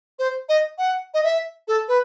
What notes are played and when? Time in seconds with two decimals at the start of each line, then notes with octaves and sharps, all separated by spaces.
0.19 C5
0.49 D#5
0.78 F#5
1.14 D#5
1.24 E5
1.68 A4
1.88 B4